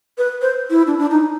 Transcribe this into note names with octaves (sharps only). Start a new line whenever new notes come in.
B4
C5
E4
D4
D4
D#4